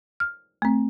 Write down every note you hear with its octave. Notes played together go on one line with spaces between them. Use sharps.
F6
A3 C4